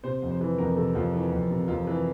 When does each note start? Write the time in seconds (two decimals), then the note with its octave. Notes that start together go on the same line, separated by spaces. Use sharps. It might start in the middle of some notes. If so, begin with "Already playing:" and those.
0.03 C3 C5
0.22 F2
0.31 C5
0.41 E3
0.58 F2 A#4
0.76 C3 A4
0.95 F2 F4
1.13 E3
1.32 F2
1.50 C3
1.68 F2 F4
1.87 E3